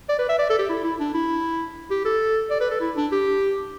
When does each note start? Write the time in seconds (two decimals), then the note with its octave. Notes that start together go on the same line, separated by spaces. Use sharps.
0.09 D5
0.19 B4
0.29 E5
0.39 D5
0.50 A4
0.59 G4
0.69 E4
0.84 E4
1.00 D4
1.14 E4
1.91 G4
2.05 A4
2.50 D5
2.60 B4
2.71 A4
2.81 E4
2.96 D4
3.12 G4